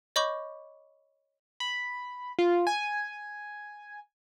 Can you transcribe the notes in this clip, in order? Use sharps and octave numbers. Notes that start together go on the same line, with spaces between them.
C#5 D#5 B5 C#6 D6 G6
B5
F4
G#5